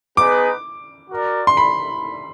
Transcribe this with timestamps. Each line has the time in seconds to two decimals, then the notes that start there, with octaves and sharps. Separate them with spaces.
0.17 B3 D#4 G#4 B4 D6
1.10 F#4 A#4 D5
1.47 C6
1.57 B5